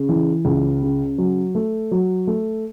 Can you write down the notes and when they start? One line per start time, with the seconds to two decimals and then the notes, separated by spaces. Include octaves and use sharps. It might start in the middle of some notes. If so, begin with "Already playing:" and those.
Already playing: C#3
0.09 E3
0.45 C#2
0.82 C#3
1.18 F#3
1.55 A3
1.91 F#3
2.27 A3